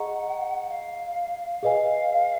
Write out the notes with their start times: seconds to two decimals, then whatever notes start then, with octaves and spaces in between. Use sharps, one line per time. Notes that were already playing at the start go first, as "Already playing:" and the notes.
Already playing: G#4 D#5 F#5 A#5 C#6
0.69 F5
1.63 G#4 B4 D#5 F5 G#5